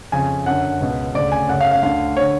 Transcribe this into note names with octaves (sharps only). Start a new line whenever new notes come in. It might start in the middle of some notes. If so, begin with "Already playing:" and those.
F2 C#3 G#5
F#2 D3 F#5
C#2 B2
D2 C#3 D5
G#5
F#2 C#3 F#5
F5
F5
D2 D3 F5
C#5
D3